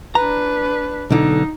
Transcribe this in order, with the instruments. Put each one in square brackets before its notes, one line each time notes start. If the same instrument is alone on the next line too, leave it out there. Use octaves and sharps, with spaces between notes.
[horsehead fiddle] D4 B4 [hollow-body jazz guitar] A#5
[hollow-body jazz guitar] B1 D3 [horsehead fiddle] D#4